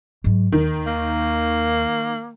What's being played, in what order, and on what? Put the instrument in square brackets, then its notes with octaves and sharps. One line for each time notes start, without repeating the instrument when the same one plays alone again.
[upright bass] G#2 F#3
[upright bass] D#2 [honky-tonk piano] D#3
[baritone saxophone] A#3